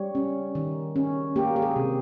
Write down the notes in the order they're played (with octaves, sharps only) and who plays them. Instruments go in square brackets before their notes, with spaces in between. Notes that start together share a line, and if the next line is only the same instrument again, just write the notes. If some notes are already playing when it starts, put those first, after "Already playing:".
Already playing: [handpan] G3 C#5
C#4
D#3
C#4
A#3 G4
G4
G#4
C3